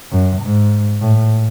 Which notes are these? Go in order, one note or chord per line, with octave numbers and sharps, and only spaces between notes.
F#2
G#2
A2